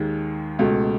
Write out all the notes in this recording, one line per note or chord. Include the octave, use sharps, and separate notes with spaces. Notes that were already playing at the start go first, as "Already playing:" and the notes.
Already playing: D#2 D#3 G#3
C#2 B2 A3